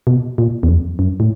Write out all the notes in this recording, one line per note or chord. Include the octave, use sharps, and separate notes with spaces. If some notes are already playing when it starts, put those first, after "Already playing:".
B2
A#2
E2
F2
F#2
A2